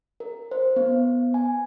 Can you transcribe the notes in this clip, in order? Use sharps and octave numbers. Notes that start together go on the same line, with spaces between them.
A#4
C5
B3
G#5